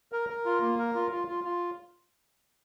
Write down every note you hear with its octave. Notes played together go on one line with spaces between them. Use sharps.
A#4
A#4
F4
A#3
A#4
F4
F4
F4
F4